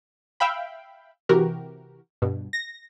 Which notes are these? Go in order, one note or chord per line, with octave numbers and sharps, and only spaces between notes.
E5 F5 G5 B5
C3 E3 F#4 G4 A#4
G2 B2
A#6